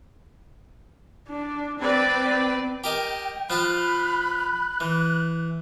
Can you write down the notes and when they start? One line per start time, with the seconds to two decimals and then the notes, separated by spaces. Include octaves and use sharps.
1.29 D4
1.80 C4 B4 D5
2.84 G4 A#4 D#5 G5
3.50 F3 F4 A5 B5 F#6
4.80 E3